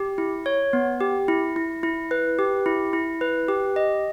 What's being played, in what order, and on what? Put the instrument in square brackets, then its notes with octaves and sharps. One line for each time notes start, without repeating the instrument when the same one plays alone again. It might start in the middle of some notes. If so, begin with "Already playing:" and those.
Already playing: [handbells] G4
E4
C#5
B3
G4
E4
E4
E4
B4
G4
E4
E4
B4
G4
D#5